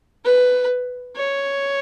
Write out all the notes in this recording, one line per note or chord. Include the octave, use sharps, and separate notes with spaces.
B4
C#5